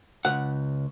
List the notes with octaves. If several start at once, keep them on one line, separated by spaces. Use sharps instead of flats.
C#2 F#5